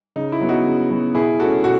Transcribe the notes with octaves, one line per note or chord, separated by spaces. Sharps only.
C#3 D#4
E4
F#3 B3
D#4 F#4
C#3
F#3 B3
B2 E4 G#4
A3 C#4 F#4 A4
B2 F#4 A4